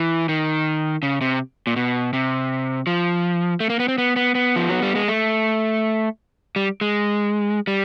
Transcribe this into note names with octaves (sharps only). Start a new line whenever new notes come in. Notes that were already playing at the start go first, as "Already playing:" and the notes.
Already playing: E3
D#3
C#3
C3
A#2
B2
C3
F3
A3
A#3
B3
C4
B3
B3
B3
F3
F#3
G3
G#3
A3
G3
G#3
G3